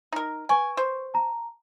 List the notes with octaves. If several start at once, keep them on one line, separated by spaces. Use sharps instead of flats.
D#4 A#4
B4 G#5 C#6 D7
C5
A5 A#5